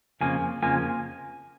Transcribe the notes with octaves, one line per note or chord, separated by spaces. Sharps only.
F2 C#3 F3 A#3 G#5
F2 C#3 F3 A#3 G#5